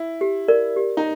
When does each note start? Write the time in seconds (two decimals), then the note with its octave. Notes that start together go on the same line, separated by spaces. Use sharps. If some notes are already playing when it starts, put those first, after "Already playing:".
Already playing: E4
0.21 G4
0.48 A#4 D5
0.76 G4
0.97 D#4